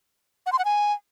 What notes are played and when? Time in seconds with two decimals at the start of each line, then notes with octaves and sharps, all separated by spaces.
0.46 F#5
0.52 C6
0.59 F#5
0.65 G#5